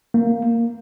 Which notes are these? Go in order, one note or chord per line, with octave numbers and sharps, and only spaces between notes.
A#3